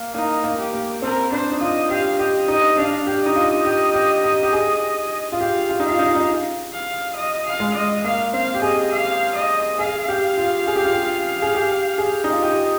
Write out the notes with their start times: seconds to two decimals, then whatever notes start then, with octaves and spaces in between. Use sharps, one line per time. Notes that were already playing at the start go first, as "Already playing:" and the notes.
Already playing: A#3
0.14 A#3 D#4
0.44 A#3
0.58 G4
0.73 A#3
1.02 C4 A#4
1.31 D4 C5
1.51 D#4
1.60 F4 D#5
1.90 G4 F5
2.19 G4 D#5
2.48 D#4 D#5
2.77 D4 F5
3.07 G4
3.21 D#4 D#5
3.36 F4
3.65 G4
3.94 G4
4.24 G4
4.43 G4
4.53 G#4
5.32 F4
5.41 G4 F5
5.69 F4
5.80 D#4
5.85 F4 F5
5.99 D#4
6.07 F4
6.15 D#4
6.73 F5
7.16 D#5
7.46 F5
7.60 G#3
7.74 D#5
8.03 A#3 F5
8.33 C4 F5
8.54 G4
8.62 G#4 D#5
8.92 F5
9.35 D#5
9.79 G#4 F5
10.08 G4
10.38 F4
10.67 G#4
10.76 G4
10.85 F4
10.93 G4
11.42 G#4
11.55 G4
11.98 G#4
12.24 D#4
12.33 F4
12.43 G4 D#5